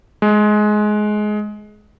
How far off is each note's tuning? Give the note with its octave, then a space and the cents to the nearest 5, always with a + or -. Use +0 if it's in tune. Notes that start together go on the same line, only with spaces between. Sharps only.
G#3 +20